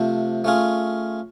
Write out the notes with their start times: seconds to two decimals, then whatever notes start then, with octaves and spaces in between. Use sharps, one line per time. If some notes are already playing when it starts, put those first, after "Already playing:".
Already playing: C3 F3 A3
0.44 A3 C#4 F4 G#4